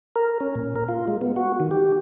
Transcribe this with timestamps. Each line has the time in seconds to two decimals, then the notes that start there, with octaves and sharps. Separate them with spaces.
0.16 A#4
0.40 C#4
0.55 A#2
0.76 A#4
0.88 F4
1.08 G#3
1.21 B3
1.36 F#4
1.60 D#3
1.71 G4